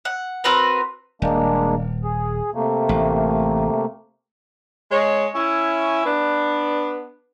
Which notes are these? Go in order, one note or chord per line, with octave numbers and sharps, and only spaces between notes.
F#5
C4 F#4 A#4 B4
D#1 G#3 A#3 D4
G#4
C3 A3 A#3
A1
G#3 C#5
C#4 E4
B3 D4